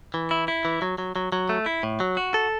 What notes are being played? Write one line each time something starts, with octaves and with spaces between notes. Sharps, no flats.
E3
E4
E4
E3
F#3
F#3
F#3
F#3
A3
E4
A2
F#3
F#4
A4